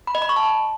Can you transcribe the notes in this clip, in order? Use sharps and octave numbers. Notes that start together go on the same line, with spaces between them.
B5
D#5
B5
C#6
A5